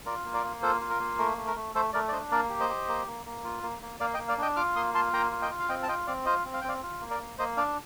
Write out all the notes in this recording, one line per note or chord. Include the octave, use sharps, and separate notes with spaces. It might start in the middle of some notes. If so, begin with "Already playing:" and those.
F4 A#4 D5
A#3
A#4 D5
A#3
F4 A4 C5
F4
A#4
A#3
A3 A#4
A3
A#4
A3
A3 A4 C5
A3 A#4 D5
D5
D4 C5 D#5
A#3 A#4 D5
G4
C5 D#5
G4
A#3
A#3
A#3
F4
A#3
A#3
A#3 D5 F5
D#5 G5
A#3
D5 F5
D4 D#5 G5
F4 D6 F6
A#3 C6 D#6
F4 A5 C6
A#3 G5 A#5
F4
D#5 G5
F4
F5
C4 D#5 G5
A5
F4 D#5 G5
C4 D5 F5
F4 C5 D#5
C4
F5
G5
C4 D5 F5
F4
A#3
A#4 D5
A#3
A#3 C5 D#5
D4 D5 F5